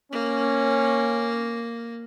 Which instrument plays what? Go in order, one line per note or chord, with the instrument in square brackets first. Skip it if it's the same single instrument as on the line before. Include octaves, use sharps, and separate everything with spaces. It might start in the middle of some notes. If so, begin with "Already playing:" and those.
[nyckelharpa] A#3 [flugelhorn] C#4